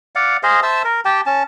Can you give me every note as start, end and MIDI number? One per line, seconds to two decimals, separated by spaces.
0.15 0.37 74
0.15 0.37 77
0.15 0.37 78
0.43 0.60 68
0.43 0.60 72
0.43 0.60 75
0.43 0.60 77
0.63 0.82 72
0.63 0.82 76
0.63 0.82 81
0.63 0.82 88
0.84 1.01 70
1.05 1.21 67
1.05 1.21 79
1.05 1.21 81
1.26 1.43 61
1.26 1.43 81